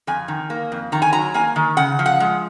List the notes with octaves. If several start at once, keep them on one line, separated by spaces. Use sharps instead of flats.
F2 G#5
D#3
A#3
F2
D#3 A#5
G#5
F#3 A#5
A#3 G#5
D#3
C#3 F#5
F3
F#5
G#3